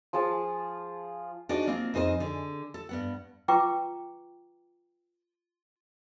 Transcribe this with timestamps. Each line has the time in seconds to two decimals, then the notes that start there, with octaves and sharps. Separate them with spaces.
0.13 F3 G#4 A5
1.49 D4 D#4 F#4 G#4 C5 D5
1.67 A#3 C4 F4
1.94 F2 D#4 G#4 C5 D#5
2.20 D3 G#4
2.74 A4
2.89 G2 B3 F#5
3.48 F4 B4 G5 A#5 C#6 D6